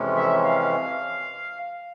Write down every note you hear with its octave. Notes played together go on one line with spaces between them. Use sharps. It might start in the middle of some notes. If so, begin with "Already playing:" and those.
Already playing: F2 C3 E3 G#3 C#4
E5
F5